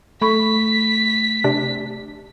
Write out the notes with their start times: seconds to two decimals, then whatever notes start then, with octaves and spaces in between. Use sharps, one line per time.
0.21 A3 A4 B5 C#6 B6
1.44 C3 D4